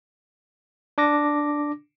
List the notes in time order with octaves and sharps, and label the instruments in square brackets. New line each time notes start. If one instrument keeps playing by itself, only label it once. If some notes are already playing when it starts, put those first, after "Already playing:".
[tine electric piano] D4 D6 A#6